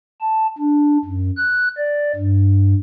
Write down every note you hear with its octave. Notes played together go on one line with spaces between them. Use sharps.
A5
D4
F#2
F#6
D5
G2